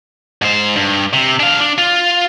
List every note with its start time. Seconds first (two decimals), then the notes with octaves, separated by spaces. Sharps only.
0.42 G#2 C5
0.76 G2
1.13 C3
1.40 D4 F5
1.60 D4
1.78 F4